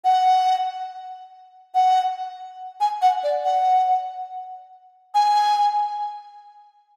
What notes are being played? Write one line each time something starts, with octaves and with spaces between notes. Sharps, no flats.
F#5
F#5
G#5
F#5
D5
F#5
G#5